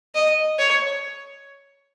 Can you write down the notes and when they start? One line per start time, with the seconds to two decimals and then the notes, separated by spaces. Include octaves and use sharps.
0.15 D#5
0.59 C#5